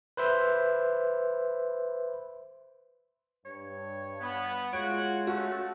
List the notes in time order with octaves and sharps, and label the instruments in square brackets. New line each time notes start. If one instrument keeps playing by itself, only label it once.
[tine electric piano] B4 C5 E5
[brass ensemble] G2 [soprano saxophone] C#5
[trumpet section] B3
[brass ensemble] G#3 F4 [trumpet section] F#4 F#5 [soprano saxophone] C#5 [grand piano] D7
[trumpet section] A3 [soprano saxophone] C#4 [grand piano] F#4